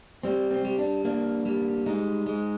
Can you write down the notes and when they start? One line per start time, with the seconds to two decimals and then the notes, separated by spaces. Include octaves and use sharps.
0.23 G3 C4
0.51 C4
0.65 G3
0.79 D4
1.05 A#3 D4
1.46 G3
1.86 G#3 D#4
2.26 G#3